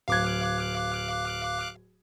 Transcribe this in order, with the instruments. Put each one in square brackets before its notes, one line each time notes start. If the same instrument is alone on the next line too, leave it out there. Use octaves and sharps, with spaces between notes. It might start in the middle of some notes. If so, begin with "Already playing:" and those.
[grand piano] D1 G#6 [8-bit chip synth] F5 D6 F#6